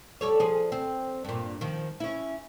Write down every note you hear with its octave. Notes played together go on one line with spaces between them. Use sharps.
G3 A4 C#5
F3 G#4
C4
G2 A#2
D#3 F3
C#4 E4